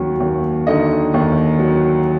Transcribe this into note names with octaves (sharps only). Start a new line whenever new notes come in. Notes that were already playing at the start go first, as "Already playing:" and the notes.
Already playing: D#2 F#3 C#4
D#2
D3 D#4 D#5
D#2
F#3